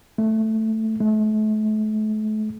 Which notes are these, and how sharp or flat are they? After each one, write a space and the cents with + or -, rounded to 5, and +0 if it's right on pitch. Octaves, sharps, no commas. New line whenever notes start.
A3 +5
A3 -35